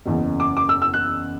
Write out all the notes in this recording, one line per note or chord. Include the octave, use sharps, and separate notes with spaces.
F#1 E2 C#3
D6
D6
E6
E6
F#6